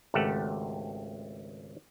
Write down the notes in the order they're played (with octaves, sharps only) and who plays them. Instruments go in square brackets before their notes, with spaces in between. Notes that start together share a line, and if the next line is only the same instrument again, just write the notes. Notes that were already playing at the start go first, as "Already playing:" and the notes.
[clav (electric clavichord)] G#1 C#2 A3 G4 A4 F#5